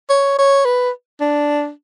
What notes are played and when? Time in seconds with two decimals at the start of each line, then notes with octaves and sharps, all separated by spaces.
0.10 C#5
0.39 C#5
0.65 B4
1.21 D4